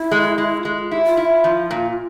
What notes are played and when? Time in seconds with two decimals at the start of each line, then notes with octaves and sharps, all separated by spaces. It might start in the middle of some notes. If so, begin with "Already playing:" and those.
Already playing: E4
0.11 G#3
0.38 G#3
0.57 F4
0.65 G#3 E4
0.78 F4
0.91 E4 G4
1.04 F4
1.17 E4
1.44 F3
1.71 A#2